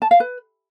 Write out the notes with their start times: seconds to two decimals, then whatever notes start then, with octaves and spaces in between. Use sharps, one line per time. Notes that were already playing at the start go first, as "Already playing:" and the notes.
0.02 A5
0.11 F5
0.20 B4